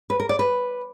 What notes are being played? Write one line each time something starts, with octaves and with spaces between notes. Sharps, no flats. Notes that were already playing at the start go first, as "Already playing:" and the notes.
B4
A#4
D5
B4